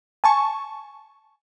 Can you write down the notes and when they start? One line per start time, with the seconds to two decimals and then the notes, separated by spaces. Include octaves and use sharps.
0.24 G#5 A5 C#6